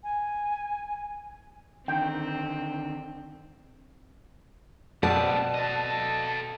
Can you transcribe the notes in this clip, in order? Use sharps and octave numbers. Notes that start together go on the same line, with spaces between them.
G#5
D3 D#3 C4 G5
B2 B3 C4 D5 A5
A4 D#5